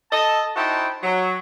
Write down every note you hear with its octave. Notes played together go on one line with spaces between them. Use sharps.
A4 D#5 A5
D#4 E4 F#4 C5 G5 A5
F#3